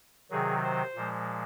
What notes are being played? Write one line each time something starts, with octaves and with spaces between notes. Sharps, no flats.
C3 D#3 F#3 G#4
C5
A#2 F3 G#3